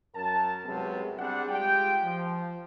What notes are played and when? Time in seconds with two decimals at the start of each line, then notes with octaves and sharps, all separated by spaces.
0.15 F#2 A#4 A5
0.66 C2 F#2 C3 F#3 G#3 B3
1.19 G3 C4 D4 G#4 F#5
1.49 G#3 F4 G4 G5
2.04 F3